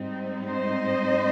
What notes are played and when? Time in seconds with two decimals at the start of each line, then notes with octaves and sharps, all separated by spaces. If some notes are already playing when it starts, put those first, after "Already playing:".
Already playing: G#2 G3 C4 D#4
0.46 C5 D#5